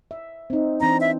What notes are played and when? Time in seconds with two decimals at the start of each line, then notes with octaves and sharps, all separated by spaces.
0.11 E5
0.50 C4 D#4
0.81 E3 C4 D4 A#5
1.01 E5